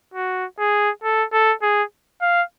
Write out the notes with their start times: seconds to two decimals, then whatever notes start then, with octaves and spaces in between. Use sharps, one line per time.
0.14 F#4
0.59 G#4
1.04 A4
1.33 A4
1.62 G#4
2.21 F5